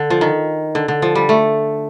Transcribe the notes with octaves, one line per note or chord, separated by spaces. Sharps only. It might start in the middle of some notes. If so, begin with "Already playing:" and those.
Already playing: D3
F3
D#3
D3
D3
F3
G3
A3